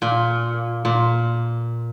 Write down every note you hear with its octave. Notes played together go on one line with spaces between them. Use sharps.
A#2
A#2